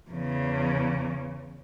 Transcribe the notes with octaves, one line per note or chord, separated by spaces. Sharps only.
E2 C#3